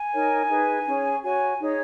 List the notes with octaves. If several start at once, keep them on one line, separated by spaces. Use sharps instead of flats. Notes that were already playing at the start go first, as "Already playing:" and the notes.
Already playing: G#5
D#4 A#4 C#5
D#4 G#4 B4
C#4 G#4 C#5
F#4 C#5 G#5
D#4 G#4 C#5